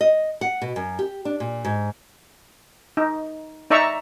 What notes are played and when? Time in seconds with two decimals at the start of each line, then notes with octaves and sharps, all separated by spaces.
0.01 D#5
0.41 F#5
0.62 B2
0.76 F#2
0.99 G4
1.25 D4
1.40 A#2
1.65 G#2
2.97 D#4
3.70 D#4 D5 E5 A#5 C#6 E6